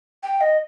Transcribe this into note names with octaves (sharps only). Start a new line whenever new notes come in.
G5
D#5